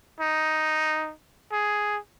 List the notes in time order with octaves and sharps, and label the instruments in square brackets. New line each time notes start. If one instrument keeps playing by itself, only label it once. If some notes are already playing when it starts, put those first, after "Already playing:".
[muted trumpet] D#4
G#4